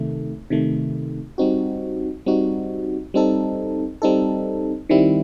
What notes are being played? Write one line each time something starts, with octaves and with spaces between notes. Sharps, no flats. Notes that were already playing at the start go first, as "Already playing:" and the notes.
Already playing: C3 D#3 A3
C3 D#3 A3
G3 C4 D#4 F#4
G3 C4 D#4 F#4
G3 C4 D#4 A4
G3 C4 D#4 A4
D#3 G3 C4 E4